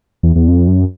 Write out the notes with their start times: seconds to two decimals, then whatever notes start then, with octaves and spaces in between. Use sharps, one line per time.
0.23 E2
0.36 E2
0.48 F2
0.67 F#2